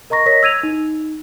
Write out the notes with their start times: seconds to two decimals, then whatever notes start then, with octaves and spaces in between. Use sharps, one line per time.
0.10 A#4 D#5 A#5 C#6 A#6
0.26 A#4 C#5 D#5 A#6 B6
0.43 E6 G#6 D#7 F7
0.63 D#4